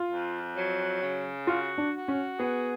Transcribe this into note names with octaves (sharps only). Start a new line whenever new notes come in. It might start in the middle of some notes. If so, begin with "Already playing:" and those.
Already playing: F4
F2
F#3
C#3
F4 F#4
D4
F#4
C#4
B3 G#4